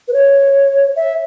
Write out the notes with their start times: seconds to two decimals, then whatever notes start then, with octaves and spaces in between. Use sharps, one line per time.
0.08 B4
0.13 C#5
0.96 E5